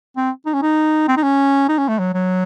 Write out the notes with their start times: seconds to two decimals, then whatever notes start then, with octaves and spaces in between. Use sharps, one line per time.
0.17 C4
0.46 D#4
0.54 C#4
0.62 D#4
1.08 C4
1.17 D#4
1.23 C#4
1.69 D#4
1.78 C#4
1.89 A3
1.99 F#3
2.14 F#3